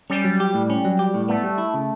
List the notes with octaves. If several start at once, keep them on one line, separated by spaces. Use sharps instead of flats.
G3 C#4
F#3
G4
A2
C#4
F#3
G4
A2
A3 B3
G3
E4
C#3